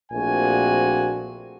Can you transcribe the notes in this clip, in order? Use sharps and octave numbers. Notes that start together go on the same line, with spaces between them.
A#1 A#2 A3 C4 F#4 G#5